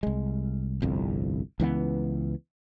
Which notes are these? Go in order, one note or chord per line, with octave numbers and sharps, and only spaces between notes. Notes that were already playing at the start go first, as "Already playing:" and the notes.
C2 G#3
G1 C2 F2
C#2 E3 F#3 B3